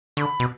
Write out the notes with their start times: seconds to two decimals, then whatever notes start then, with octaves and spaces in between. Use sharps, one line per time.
0.17 D3 B5 C#6
0.40 B2